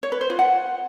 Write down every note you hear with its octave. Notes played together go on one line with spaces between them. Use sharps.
C#5
B4
C5
F4
F#5